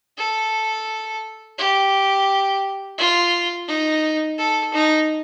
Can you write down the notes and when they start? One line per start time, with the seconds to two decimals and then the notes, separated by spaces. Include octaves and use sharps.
0.18 A4
1.58 G4
2.98 F4
3.68 D#4
4.38 A4
4.73 D#4